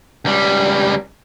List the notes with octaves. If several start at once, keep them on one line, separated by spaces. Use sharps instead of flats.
C#2 G3